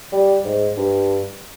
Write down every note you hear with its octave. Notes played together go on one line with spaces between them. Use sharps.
G3
G#2
G2